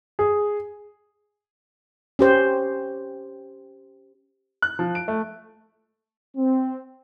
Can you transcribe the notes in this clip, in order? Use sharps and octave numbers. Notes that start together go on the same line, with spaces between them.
G#4
C#4 G4 C5
F#6
F3
D7
A3
C4